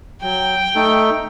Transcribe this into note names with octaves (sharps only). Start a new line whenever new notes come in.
F#3 G5
A3 D#4 A4